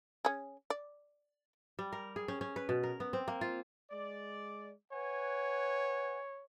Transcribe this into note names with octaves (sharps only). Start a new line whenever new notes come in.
C#4 G#4
D5
G3
A#4
G#4
C#4
C#4
B4
B2
A#4
B3
C4
A#3
F4
G#3 D5
B4 C#5 F#5 G#5